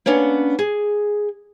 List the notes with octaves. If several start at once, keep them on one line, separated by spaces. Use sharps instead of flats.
A#3 B3 C#4 D4
G#4